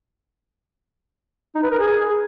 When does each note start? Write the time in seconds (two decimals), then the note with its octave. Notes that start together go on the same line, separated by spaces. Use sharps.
1.55 D#4
1.63 B4
1.71 A#4
1.79 G#4